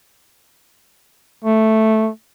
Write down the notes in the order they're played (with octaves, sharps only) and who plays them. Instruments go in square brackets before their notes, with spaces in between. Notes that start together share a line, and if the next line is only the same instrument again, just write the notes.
[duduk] A3